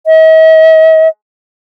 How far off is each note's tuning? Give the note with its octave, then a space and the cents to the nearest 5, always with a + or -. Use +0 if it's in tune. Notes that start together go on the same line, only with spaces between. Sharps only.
D#5 +45